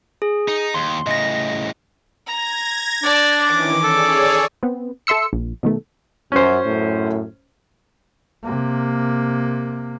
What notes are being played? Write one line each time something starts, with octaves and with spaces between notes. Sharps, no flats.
G#4
D#4
D#2 C6
A2 C#3 D#5 A#6
A#5 G#6 A#6
D4 D5 A5
D#3 E3 C#4 D6
G#4 A4 C#5 D5
B3 C4
A4 E5 C6 E6 C#7
A#1
B2 D#3 A3
F#2 C#4 C5
F#2 A2
C3 A#3